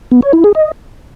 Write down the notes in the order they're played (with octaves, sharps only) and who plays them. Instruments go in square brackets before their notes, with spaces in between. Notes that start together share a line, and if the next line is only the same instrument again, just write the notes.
[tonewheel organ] B3
C#5
E4
G#4
D#5